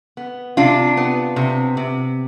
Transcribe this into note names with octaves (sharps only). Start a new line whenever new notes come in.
B3
C3 D4 F4
B3
C3
C3